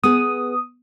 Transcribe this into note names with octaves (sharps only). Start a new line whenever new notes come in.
B3 G#4 D#6